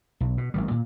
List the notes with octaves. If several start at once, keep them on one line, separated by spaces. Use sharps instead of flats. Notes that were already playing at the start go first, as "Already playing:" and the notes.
B1
B2
A1 D#3 G3
A#2